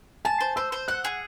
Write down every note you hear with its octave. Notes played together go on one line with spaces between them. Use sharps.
G#5 A5
C5
C5 E6
C5
F#5 F#6
G#4